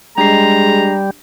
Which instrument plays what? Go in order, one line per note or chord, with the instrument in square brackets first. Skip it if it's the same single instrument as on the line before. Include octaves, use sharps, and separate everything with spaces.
[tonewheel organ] G3 [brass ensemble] G#3 [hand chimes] D4 G4 C7 [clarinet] A#5